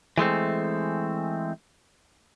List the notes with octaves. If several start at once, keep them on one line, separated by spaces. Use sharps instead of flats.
E3 G#3 A3 C4